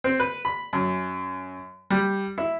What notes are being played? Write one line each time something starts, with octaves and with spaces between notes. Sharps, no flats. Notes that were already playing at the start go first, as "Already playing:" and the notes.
C4
B4
B5
F#2
G3
E4